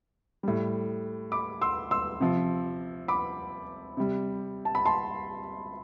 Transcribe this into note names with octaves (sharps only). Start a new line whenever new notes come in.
A2 G3
B5 D6
C6 E6
C6 E6
C3 F3
B5 D6
C3 G3
A5
B5
A5 C6